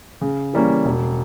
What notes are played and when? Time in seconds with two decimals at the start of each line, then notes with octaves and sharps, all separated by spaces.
0.21 C#3
0.53 E3 G3 A#3 C#4
0.85 E1